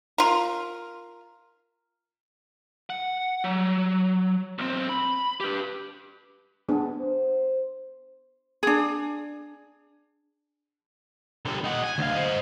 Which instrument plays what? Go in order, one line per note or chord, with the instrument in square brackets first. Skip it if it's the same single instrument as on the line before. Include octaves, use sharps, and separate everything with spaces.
[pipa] F4 A#4
[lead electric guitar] F#5
F#3
B1 C4
B5
G4 B4
[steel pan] B3 D4 G#4
[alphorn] C5
[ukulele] D4 G#4
[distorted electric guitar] D3 G3
D#4 F#5
G#5
D2 F5
C5 D#5